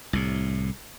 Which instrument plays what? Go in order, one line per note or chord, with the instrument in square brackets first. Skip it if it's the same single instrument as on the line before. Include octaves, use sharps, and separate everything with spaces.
[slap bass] C2 A2